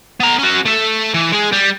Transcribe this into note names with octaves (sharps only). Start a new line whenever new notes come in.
B3 A#5
C#4 F#4
A3 A4
E3
G#3 G#4
G3